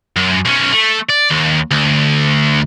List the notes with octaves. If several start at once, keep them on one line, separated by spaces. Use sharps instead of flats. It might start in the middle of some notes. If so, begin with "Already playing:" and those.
F#2
B1 C#4
A3
D5
D#2
D2